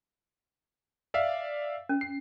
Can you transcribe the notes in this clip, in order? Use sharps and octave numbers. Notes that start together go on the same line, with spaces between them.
D5 E5 F5
C#4
C7